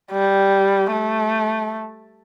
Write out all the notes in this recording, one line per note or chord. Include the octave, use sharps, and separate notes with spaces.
G3
A3